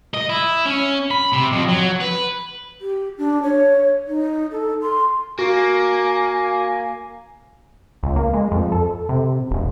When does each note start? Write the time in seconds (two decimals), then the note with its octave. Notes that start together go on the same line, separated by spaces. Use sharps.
0.14 D#5
0.29 E4
0.66 C#4
1.11 B5
1.33 C3
1.52 F2
1.68 F#3
2.01 B4
2.81 G4
3.18 D4
3.43 C#5
4.08 D#4
4.51 A4
4.82 C6
5.39 A#3 F#4 G#5
8.03 C#2
8.16 A#3
8.33 G#3
8.52 F2
8.72 A4
9.09 C3
9.51 E1